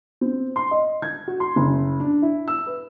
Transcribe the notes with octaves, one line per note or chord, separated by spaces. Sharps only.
C4
C6
D#5
G#6
F#4
C6
F#1
D4
E4
E6
B4